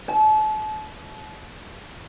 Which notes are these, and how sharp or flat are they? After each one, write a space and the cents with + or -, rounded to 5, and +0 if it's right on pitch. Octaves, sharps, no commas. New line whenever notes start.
A5 -35